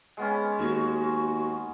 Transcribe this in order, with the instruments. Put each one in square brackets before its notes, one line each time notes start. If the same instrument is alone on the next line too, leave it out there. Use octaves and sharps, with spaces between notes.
[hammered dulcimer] G#3 B3 C#4
[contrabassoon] D#2 [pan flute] F#4